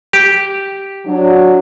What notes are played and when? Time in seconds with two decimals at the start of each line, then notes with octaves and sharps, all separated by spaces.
0.13 G4
1.06 F#3 D4